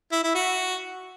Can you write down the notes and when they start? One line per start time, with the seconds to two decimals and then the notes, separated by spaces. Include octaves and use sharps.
0.12 E4
0.24 E4
0.35 F#4